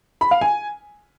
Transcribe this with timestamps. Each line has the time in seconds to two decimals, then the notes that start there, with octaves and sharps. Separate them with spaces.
0.21 B5
0.31 F5
0.41 G#5